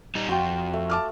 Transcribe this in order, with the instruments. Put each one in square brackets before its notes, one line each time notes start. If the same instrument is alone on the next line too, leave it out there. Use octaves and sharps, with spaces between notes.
[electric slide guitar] G3 D#4
[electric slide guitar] F2 [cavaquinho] F4 G5 C6 [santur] F#4
[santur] A3
[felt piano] A5 D6 F6